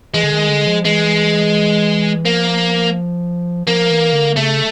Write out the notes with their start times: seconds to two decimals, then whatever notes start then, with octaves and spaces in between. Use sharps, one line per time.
0.14 E3 G#3
0.23 D3
0.32 D#3
0.49 D3
0.67 F3
0.85 E3 G#3
2.25 F3 A#3
3.67 F3 A#3
3.91 E3
4.13 D3
4.37 C#3 A3